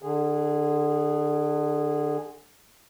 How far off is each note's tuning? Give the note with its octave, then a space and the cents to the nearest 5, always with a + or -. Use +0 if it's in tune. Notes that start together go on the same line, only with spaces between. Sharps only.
D3 +25 G#4 -15